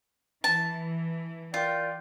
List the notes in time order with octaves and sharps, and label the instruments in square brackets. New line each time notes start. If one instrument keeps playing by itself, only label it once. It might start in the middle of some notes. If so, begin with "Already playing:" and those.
[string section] E3 [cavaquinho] A5
[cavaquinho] F4 [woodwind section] A#4 D5 G5